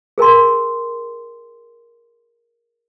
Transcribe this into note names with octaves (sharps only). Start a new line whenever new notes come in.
G#4 A#4 G#5 C6